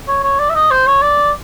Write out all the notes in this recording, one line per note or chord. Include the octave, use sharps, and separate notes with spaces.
C#5
C#5
D5
E5
D#5
C5
C#5
D5